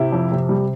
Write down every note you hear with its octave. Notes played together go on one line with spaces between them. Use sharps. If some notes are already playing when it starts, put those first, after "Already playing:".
Already playing: C3 E4 G4
F2
C3
G3